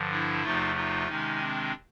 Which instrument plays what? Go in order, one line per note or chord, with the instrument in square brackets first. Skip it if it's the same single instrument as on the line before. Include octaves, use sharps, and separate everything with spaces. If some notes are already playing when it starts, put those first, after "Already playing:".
Already playing: [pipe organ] G2 D3 F3
D4 E4
E2 C3 F3 A3 D#4 F4
D#4 F4
C3 D#3 G#3 C#4 D#4
C4 D4